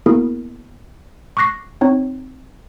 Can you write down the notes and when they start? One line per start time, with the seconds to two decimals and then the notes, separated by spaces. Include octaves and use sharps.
0.06 A#3 B3 E4 F#4 G#4 A#4
1.37 C#6 D6 F#6 A#6 C7
1.81 C4 D#4 C#5